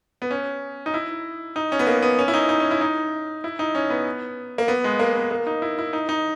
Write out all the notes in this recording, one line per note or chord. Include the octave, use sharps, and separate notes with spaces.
B3
C#4
D#4
E4
D#4
C#4
B3
A#3
B3
C#4
E4
D#4
D#4
C#4
E4
D#4
E4
D#4
C#4
B3
A#3
B3
G#3
A#3
B3
A#3
D#4
E4
E4
D#4
D#4